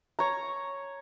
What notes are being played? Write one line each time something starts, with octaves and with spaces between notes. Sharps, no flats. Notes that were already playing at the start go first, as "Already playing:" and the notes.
C#5 A#5